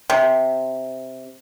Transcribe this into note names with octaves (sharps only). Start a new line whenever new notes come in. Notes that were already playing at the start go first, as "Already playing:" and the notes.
C3